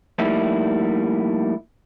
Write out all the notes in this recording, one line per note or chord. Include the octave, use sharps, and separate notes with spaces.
F3 G3 A3 A#3 D#4 E4